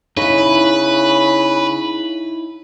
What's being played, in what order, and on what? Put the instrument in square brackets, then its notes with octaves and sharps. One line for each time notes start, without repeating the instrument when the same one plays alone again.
[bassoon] C#3 [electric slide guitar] D#4 E4 [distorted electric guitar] B4